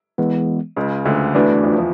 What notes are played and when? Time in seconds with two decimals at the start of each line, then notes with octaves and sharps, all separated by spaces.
0.18 E3 G#3 B3
0.76 C#2 C#3
1.05 D2 D3
1.34 E2 E3 A3 D4 F#4 B4 D5
1.64 F2 F3
1.78 F3